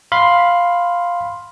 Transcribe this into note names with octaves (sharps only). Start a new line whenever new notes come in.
F5 B5 C6